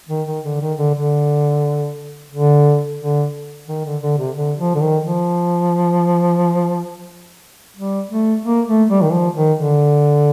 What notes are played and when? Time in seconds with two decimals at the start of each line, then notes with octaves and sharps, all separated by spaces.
0.09 D#3
0.27 D#3
0.44 D3
0.61 D#3
0.78 D3
0.95 D3
2.32 D3
3.00 D3
3.68 D#3
3.85 D3
4.02 D3
4.18 C3
4.36 D3
4.59 F3
4.75 D3
4.81 D#3
5.04 F3
7.77 G3
8.11 A3
8.45 A#3
8.68 A3
8.90 G3
9.03 D#3
9.13 F3
9.36 D#3
9.59 D3